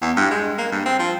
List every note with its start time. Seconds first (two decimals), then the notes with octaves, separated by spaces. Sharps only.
0.02 E2
0.16 G2
0.31 G#3
0.58 A#3
0.72 G2
0.86 C4
0.99 F3